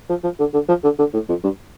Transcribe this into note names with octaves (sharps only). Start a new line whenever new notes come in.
F3
F3
D3
D3
F3
D3
D3
A2
F2
G2